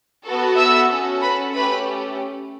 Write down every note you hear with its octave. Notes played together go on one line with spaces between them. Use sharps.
B3 F#4 A4
E5 E6
C#4 F#4 A4
B4 B5
A3 C#4 G4 B4 B5